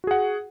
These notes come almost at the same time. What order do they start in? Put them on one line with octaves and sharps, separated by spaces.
F#4 G#4 F#5